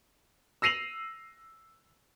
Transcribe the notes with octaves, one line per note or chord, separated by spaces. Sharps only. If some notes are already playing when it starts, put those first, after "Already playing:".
E6 A#6 C7 D#7 F7 F#7